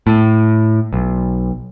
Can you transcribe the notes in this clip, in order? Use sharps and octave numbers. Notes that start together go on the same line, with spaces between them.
A2
B1